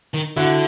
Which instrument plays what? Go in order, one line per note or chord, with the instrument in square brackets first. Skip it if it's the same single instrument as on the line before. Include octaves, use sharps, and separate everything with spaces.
[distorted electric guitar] D#3
[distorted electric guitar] D3 [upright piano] E4 F#4